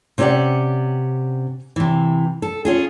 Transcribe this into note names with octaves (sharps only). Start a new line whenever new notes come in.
C3 C#4 G4 C5 D5 F#5
C3 E3
A4
C#4 F4 G#4